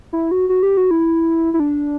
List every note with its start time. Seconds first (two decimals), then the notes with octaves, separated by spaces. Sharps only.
0.13 E4
0.31 F#4
0.49 F#4
0.63 G4
0.77 F#4
0.91 E4
1.54 E4
1.60 D4